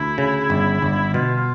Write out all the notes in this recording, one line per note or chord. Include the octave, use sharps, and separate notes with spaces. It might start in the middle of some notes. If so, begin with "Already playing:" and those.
Already playing: D2 E4
C#3
G1
G1
B2 F4
F4